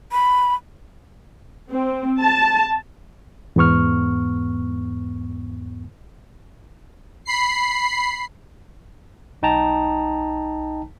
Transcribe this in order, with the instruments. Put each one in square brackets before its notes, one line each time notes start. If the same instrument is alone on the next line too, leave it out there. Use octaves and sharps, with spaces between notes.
[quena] B5
[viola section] C4
A5
[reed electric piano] E2 G#2 B3 C#6 F6
[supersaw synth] B5 C7
[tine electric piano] B1 D#4 G5 A5 A#5